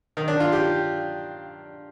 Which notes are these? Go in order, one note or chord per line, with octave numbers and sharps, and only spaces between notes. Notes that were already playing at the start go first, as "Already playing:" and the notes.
D#3
D4
F4
G4